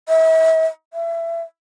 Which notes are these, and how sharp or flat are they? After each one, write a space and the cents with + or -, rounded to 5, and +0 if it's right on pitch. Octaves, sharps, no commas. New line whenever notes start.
E5 -40
E5 +25